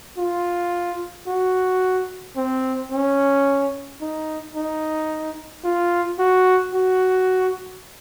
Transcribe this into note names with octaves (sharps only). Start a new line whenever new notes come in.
F4
F#4
C4
C#4
D#4
D#4
F4
F#4
F#4